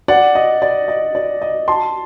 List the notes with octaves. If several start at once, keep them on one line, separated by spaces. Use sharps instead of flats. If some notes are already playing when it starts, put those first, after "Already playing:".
D5 F#5
D#5
D5
D#5
D5
D#5
A5 C6